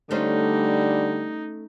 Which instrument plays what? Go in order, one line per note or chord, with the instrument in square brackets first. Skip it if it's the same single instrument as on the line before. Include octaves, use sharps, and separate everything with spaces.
[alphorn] D3 [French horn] G3 [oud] A3 C#4 C5 [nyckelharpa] D#4